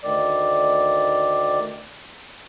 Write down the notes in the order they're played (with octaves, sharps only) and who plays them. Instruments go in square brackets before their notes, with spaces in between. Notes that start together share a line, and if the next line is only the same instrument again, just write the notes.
[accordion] D2 D#3 D5